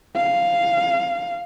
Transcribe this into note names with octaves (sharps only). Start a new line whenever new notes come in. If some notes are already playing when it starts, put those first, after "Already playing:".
F5